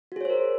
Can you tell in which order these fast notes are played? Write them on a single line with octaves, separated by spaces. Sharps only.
F#4 G#4 C#5 C5 A#4